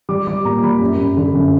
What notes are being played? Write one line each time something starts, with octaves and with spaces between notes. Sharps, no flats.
G3 D6
G3 D6
A#2 A#5
G3 B5
F#2
F#2
D3
F#2